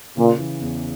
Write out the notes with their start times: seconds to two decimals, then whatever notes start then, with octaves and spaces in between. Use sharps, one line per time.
0.17 A#2 C#3
0.39 E3
0.61 E2